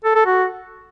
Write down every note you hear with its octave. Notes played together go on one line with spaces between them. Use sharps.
A4
A4
F#4